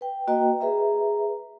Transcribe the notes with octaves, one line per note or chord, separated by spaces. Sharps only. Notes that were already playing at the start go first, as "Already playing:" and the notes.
B4 G5
A#3 F#4 B4 D#5 G5 A#5
G#4 B4 E5 A#5